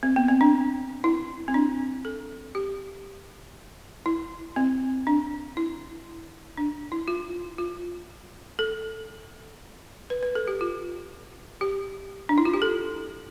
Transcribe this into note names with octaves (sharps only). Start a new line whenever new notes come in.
C4
B3
C4
D4
E4
C4
D4
A4
G4
E4
C4
D4
E4
D4
E4
F4
F4
A4
B4
B4
A4
G4
F4
G4
D4
E4
F4
G4
A4